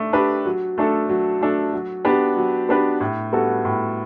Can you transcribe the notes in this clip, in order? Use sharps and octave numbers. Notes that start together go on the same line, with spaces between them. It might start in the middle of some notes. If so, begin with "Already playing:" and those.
Already playing: A3 D4
D4 G4 B4
F#3
A3 D4 A4
F#3
A3 D4 A4
F#3
B3 D4 G4 B4
F#3
B3 D4 G4 B4
A2
G3 B3 F#4 A4
A2